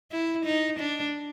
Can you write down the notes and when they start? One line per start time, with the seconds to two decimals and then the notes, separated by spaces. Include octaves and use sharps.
0.11 E4
0.45 D#4
0.80 D4